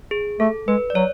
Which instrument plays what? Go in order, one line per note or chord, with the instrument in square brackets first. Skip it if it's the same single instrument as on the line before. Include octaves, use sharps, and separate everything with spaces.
[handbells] G#4
[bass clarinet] A3 [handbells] A4
[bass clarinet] G#3 [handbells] B4
[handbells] D5
[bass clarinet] F#3 [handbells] C#5